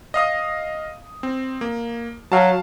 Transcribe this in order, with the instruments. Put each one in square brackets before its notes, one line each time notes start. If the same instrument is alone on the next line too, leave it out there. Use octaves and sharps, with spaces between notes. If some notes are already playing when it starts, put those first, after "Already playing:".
[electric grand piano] D#5 F5 D#6
C4
A#3
[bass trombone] F#3 [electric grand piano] F5 A5